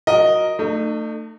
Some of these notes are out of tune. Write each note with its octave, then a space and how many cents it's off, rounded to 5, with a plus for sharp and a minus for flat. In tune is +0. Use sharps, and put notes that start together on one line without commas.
F#4 -20 A#4 +0 D#5 +0
A3 +30 D#4 -40